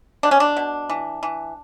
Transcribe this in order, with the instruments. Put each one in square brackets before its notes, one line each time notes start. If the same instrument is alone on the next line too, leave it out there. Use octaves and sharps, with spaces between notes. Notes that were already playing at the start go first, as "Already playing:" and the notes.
[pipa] B2 D4
C#4
D4
B2
E3
E3